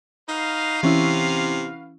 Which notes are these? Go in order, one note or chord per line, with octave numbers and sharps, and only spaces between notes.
D#4 F#4 B4 F5
C3 E3 C#4 E4